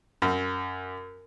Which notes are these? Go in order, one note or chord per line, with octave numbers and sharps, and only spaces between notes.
F#2